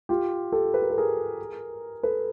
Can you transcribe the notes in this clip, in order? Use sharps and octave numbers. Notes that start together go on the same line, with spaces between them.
F4 G4
G4 A4
B4
A#4
A4
G#4 A#4
A4 B4